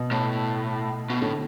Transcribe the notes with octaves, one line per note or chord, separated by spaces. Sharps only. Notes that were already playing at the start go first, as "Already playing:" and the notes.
Already playing: B2
A2
B2
A2 D3